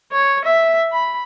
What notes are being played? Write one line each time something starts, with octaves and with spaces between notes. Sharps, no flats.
C#5
E5
B5